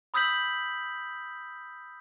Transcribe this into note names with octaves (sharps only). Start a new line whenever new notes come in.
B5 D#6 E6 G6 B6 F#7